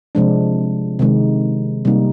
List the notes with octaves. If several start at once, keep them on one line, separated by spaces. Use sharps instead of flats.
C3 F3 G#3 D4
C3 D#3 G#3 D#4
C3 G3 A#3 D#4